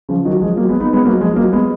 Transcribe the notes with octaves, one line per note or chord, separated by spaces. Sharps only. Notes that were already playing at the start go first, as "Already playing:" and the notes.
C#3 F3
D#3 F#3
F3 G#3
F#3 A#3
G#3 B3
B3 D#4
G#3 B3
F#3 A#3
F3 G#3
F#3 A#3
G#3 B3